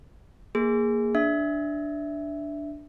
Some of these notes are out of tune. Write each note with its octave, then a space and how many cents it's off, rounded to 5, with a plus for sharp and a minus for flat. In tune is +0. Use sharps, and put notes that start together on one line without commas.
A#3 +0 G#4 -5
D4 +0 E5 +0